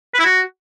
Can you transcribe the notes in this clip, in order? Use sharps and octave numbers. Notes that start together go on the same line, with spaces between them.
B4
E4
F#4